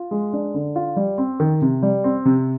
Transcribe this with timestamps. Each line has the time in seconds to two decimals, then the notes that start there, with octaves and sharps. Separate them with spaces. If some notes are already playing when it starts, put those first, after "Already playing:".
Already playing: F4
0.11 G#3
0.33 D4
0.54 D3
0.76 F4
0.96 G3
1.18 C4
1.40 D#3
1.62 C3
1.82 G3
2.04 C4
2.25 C3